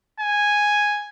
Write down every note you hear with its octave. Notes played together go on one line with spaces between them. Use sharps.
G#5